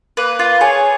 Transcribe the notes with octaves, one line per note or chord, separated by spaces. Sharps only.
A#3 B4
F4
G#4 C#5